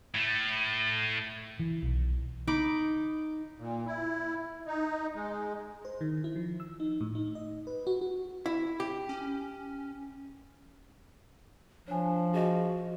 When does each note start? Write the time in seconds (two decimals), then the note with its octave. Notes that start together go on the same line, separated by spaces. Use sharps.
0.15 A2 A3
1.59 E3
1.83 B1
2.48 D#4 B5 D6
3.58 A#2
3.86 E4
4.66 D#4
5.15 G#3
5.85 C5
6.01 D#3
6.24 E4
6.36 F3
6.60 E6
6.80 D#4
7.01 A2
7.15 D#4
7.35 D#5
7.67 B4
7.87 F#4
8.01 F#4
8.46 E4
8.80 G4
9.09 C#4
11.88 F3 D4 C#5 G#5
12.33 F#4 G#4 D#5